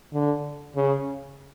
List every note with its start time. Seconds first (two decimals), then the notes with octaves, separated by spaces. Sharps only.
0.14 D3
0.75 C#3